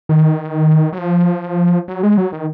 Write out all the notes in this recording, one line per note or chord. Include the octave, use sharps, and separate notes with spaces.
D#3
F#3
F3
F#3
G#3
F#3
D#3